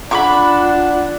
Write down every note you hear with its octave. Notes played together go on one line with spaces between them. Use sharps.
D4 F4 F#5 B5 C#6 D6